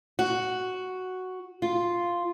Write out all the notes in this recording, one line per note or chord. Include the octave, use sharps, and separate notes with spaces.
F#4
F4